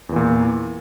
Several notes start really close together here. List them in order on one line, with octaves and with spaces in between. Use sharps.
E2 E3 A#2